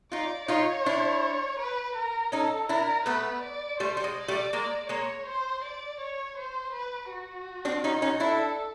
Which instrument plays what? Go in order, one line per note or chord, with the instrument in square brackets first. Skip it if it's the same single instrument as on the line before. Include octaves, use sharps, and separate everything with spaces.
[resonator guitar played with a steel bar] D#4 F4 [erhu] D5
[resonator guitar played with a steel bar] D#4 F4 [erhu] C#5
[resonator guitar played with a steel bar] D4 E4
[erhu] B4
A#4
[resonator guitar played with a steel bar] C#4 D#4 [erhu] A4
[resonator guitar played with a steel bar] D4 E4 [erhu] A#4
[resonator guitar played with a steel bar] A3 B3 [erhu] B4
[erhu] D5
[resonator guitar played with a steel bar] G3 A3 [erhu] C5
[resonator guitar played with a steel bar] G3
G#3
[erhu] D5
[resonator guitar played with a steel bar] G3 A3
[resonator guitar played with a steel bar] G#3 A#3 [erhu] D5
[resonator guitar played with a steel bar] G#3 A#3 [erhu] C#5
[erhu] C5
D5
C#5
C5
B4
F#4
[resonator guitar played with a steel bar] C4 D4
C#4 D#4
C#4 D#4
[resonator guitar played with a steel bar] D4 E4 [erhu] A4